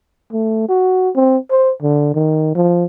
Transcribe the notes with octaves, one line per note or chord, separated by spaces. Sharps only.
A3
F#4
C4
C5
D3
D#3
F3